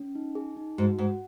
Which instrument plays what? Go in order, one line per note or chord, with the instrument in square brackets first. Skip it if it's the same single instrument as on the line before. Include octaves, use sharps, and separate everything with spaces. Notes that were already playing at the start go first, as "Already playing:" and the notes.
Already playing: [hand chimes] C#4
D#4
G#4
D#4
[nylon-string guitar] G#2 [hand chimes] F#4
[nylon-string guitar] G#2 [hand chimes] F#5